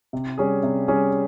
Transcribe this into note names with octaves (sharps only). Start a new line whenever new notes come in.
C3
G3 C#4 G#4
C3
G3 C#4 G#4